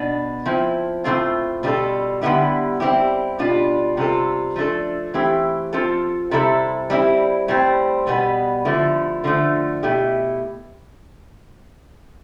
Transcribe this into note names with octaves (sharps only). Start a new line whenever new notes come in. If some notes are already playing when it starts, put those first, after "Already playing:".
Already playing: B2 B3 D4
F3 C4 E4
A2 F3 A3 C4 F4
B2 G3 D4 F4 A4
D3 G3 B3 E4 G4
G3 C4 E4 G4
B2 G3 D4 F4
C3 G3 C4 F4 A4
F3 A3 D4 A4
E3 A3 C4 E4 G4
F3 C4 F4 A4
C3 G3 C4 E4 A4
G3 C4 E4
A2 G3 C4
B2 G3 B3
D3 F3 A3 E4
D3 F3 A3
B2 A3 E4 G4